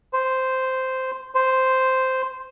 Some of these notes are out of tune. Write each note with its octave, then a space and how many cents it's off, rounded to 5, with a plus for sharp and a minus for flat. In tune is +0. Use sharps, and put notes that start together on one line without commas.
C5 -5
C5 -5